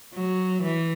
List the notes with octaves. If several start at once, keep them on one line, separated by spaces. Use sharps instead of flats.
F#3
E3